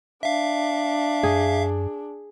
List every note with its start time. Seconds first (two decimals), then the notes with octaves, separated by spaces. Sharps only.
0.23 D4 E5 F5
1.23 F#2 G#4